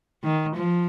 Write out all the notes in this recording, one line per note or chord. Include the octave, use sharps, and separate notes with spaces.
D#3
F3